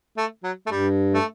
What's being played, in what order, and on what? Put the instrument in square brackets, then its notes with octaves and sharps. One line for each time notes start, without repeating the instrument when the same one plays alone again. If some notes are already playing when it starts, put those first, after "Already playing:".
[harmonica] A3
F#3
A3
[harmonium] G2 [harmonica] G3
[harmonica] A3